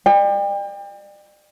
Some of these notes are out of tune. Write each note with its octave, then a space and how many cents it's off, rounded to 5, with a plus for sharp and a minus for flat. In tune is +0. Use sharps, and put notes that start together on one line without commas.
D5 +40 G5 +35